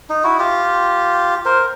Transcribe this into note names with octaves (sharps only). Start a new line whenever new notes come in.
D#4
E4 F#4
F4 G4
A#4 C5